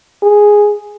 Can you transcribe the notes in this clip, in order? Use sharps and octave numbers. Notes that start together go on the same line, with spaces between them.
G#4